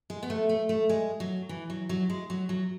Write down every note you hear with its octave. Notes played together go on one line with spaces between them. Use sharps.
G#3
B3
A3
A3
A3
G#3
F#3
E3
F#3
F#3
G#3
F#3
F#3